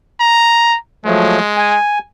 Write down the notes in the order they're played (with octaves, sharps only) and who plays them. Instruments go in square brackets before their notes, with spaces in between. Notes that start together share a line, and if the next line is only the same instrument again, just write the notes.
[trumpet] A#5
[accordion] F3 F#3 A3 [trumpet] G#3
[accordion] G#5